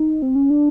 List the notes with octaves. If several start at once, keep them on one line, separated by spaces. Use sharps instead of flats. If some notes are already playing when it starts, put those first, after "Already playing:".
Already playing: D#4
C4
C#4
D4